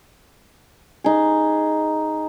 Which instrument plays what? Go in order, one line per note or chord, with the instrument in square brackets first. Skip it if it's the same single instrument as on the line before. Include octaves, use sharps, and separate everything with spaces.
[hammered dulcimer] D#4 G#4